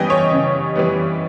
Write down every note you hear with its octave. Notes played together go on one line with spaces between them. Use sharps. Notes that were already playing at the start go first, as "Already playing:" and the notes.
Already playing: C#3 E3 G3 B3 D#5 G5 G#5
C#5
C#3
E3 G3 B3